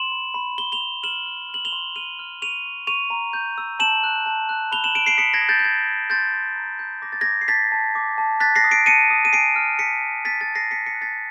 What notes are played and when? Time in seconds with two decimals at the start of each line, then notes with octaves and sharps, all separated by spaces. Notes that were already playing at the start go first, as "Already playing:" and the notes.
Already playing: C6 E7 F#7
0.12 B5
0.34 B5
0.58 B5 G7
0.72 F7 G7
0.81 B5
1.03 F6 E7 F#7
1.26 F6
1.49 F6
1.54 F#7
1.65 F7 G7
1.73 C6
1.96 F6 D#7 F7
2.19 F6
2.42 C#6 D#7 F7
2.65 C#6
2.87 C#6 D#7 F7
3.10 A#5
3.33 G6
3.58 E6
3.79 A5 E7 F#7
4.04 F#6
4.26 A5
4.49 F#6
4.72 B5 F7 G7
4.84 E7 F#7
4.95 F#6 D7 E7
5.06 C7 D7
5.18 D#6 B6 C#7
5.34 G#6 A#6
5.42 D#6
5.49 G6 A6
5.59 G6
5.64 E6 G#6
5.87 E6
6.10 C6 G6 A6
6.33 C6
6.56 A#5
6.79 G6
7.02 D6 A#6
7.12 A6
7.21 D6 G#6 A#6
7.41 C7
7.48 A5 A6 B6
7.72 A5
7.95 D6
8.18 A5
8.40 F#6 A6 B6
8.56 A#6 C7
8.64 D#6
8.71 C7 D7
8.86 A5 C#7 D#7
9.10 D#6
9.25 D#7
9.33 G#5 C7 D7
9.56 F6
9.79 F6 B6 C#7
10.02 G#5
10.25 A5 A6 B6
10.41 A6 B6
10.48 A5
10.55 A#6 C7
10.71 A5 B6 C#7
10.86 B6 C#7
10.94 F#6
11.02 A6 B6